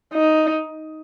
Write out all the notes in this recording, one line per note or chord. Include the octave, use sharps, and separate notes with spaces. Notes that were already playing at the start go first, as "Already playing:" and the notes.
D#4